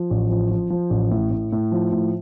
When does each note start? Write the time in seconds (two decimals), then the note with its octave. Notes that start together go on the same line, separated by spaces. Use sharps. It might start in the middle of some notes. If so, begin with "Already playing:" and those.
Already playing: F3
0.10 A1
0.30 F3
0.51 F3
0.70 F3
0.90 A1
1.11 A2
1.31 A2
1.52 A2
1.72 F3
1.92 A2